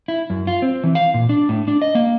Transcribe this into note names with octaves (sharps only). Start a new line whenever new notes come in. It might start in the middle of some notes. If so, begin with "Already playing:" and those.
E4
F#2
F4
C4
E3
F5
A#2
D4
A2
D4
D#5
A#3